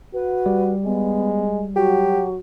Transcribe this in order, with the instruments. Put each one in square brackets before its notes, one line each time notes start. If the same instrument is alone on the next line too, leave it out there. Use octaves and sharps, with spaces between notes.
[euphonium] F#4 [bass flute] B4
[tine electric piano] G3
[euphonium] G#3 [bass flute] B3
[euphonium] F#3 [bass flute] F#4 [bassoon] G4